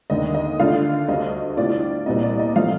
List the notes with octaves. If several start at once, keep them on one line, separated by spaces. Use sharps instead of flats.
D#2 D3 A3 D#5
D#5
D3 A3 D4 F4 F5
D2 D3 G3 D4 D#5
A2 G3 D4 F4 D5
C2 A#2 G3 C4 D#5
D5
D#5
C3 F3 A3 F5